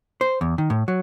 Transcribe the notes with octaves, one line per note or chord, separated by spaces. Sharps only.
C5
E2
D#3
A2
F#3